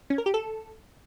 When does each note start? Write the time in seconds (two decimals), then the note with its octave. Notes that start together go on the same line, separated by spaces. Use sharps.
0.10 C#4
0.18 A#4
0.26 G4
0.34 A4